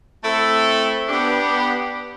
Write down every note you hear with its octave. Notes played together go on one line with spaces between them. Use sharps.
A3 C4 E4 A4
B3 D4 G4